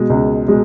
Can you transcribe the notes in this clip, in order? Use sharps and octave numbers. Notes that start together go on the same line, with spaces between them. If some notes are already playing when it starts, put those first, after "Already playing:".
Already playing: B2 G#3
C#2
B2 G#3